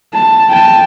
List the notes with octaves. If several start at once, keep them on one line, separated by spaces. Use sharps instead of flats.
A5
G5 A5